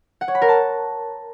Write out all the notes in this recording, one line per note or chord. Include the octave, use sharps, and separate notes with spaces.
F#5
C#5
B5
A#4
A5